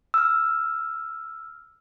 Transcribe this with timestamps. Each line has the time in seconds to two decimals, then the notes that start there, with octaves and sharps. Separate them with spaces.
0.14 E6 F6